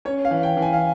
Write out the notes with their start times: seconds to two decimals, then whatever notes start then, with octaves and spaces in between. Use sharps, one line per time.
0.05 C#4 C#5
0.25 F5
0.31 E3
0.43 G5
0.57 E3
0.62 G#5
0.73 F5